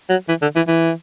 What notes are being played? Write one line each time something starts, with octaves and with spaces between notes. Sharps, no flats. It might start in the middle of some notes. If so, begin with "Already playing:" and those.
F#3
E3
D3
E3
E3